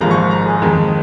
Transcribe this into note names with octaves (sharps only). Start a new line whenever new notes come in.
G#1 G#2 F3 A#3 A#5
C#6
A#5
G#4
F2 D#3 G#3